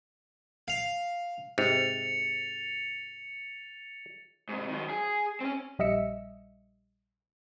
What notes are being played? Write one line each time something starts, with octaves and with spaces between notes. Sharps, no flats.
F5
G#2 C3 A6 C#7 F7
G#2 C3
D#3 F#3
G#4
C4 C#4
A#1 G3 D#5 E5 E6 C#7